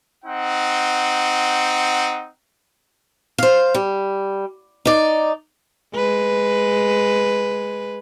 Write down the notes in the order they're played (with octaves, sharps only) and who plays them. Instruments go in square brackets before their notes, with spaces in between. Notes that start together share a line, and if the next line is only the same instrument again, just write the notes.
[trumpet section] C4 D#4 F#5
[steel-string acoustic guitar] C5 F5
G3
D#4 D5
[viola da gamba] G#3 B4